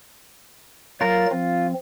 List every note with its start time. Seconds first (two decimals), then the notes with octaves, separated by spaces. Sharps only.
1.01 F#3 F4 A#4 A6
1.31 F3 C4 F4